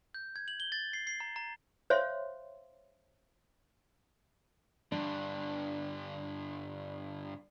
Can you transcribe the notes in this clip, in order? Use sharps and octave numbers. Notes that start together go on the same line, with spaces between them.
G6
G#6
F#7
G7
A6
C7
C7
A#5
A#5
C5 C#5 E5 F5 C6
G2 D3 D4